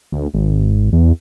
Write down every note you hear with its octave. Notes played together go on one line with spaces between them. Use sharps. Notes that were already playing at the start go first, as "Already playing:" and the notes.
D2
G#1
E2